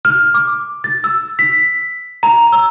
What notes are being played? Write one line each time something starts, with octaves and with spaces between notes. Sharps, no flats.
F6
D6
A6
E6
B6
A#5
E6